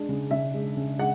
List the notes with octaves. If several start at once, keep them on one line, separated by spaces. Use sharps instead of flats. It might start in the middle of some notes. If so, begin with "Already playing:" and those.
Already playing: G#3 D4
C#3
C#3 E5
G#3
C#3
G#3 F#5